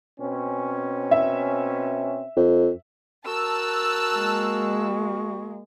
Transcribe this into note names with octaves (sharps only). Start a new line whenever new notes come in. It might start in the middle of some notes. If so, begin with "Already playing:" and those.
B2 C4 C#4
E5
F2
F#4 A#4 A5 E6 F#6
G#3 A#3